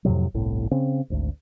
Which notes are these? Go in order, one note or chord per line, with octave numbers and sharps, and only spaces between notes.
F2 A2 C3 F#3
G1 C2 A2
C#3 C4
G#1 D2